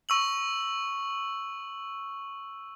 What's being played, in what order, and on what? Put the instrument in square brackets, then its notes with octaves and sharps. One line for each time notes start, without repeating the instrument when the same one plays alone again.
[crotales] C#6 E6 F#7